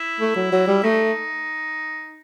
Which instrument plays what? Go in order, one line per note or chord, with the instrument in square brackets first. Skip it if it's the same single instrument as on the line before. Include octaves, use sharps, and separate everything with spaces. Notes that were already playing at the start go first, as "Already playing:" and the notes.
Already playing: [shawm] E4
[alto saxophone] A3
F#3
F#3
G3
[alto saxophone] A3 [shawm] D#4